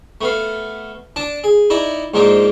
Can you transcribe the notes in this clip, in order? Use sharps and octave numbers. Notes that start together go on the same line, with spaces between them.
A3 B3 F5
D4 A5 D6
G#4
D#4 E4 D5 A#5
G#2 F3 A#3 D4 D#4